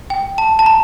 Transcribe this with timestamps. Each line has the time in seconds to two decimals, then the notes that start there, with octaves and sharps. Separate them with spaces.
0.10 G5
0.38 A5
0.59 A5
0.66 A#5